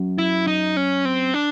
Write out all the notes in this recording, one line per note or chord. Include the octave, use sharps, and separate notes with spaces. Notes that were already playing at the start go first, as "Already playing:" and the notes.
Already playing: F#2
E4
D#4
C#4
C4
D4